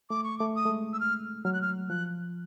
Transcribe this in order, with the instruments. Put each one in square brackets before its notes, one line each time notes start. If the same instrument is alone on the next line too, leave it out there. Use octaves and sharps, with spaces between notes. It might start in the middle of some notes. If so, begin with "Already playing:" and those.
[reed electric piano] A3 [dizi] D6
[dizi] C#6
[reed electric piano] A3 [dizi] D6
[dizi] D#6
[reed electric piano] A3
G#3
[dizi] E6
F6
[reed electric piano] F#3 [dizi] F6
[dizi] F#6
F6
[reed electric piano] F3 [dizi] F#6